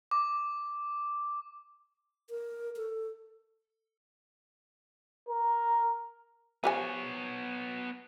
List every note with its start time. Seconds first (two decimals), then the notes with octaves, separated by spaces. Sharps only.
0.11 D6
2.30 A#4
2.77 A4
5.28 A#4
6.64 F3 B3 G4 C#5 G#5